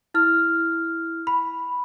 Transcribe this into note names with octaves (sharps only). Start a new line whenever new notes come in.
E4 F6
B5